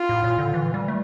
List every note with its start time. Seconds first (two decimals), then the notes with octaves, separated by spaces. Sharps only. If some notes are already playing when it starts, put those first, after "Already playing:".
Already playing: F4
0.09 A2
0.24 A#2
0.39 D3
0.54 E3
0.74 G3
0.88 A3